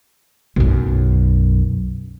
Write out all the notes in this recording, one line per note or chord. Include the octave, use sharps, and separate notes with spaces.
B1 F#2